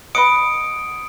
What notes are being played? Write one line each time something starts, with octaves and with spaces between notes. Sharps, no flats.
B4 D#5 F#5 D#6 C#7 D7